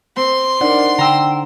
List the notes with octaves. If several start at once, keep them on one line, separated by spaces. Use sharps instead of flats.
C4 C6
D4 D#4 A#4 D5 F#5
D3 G5 A#5 E6